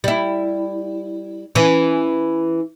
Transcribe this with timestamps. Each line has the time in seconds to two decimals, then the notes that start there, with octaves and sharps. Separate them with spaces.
0.04 G3 E4
1.55 E3 C#4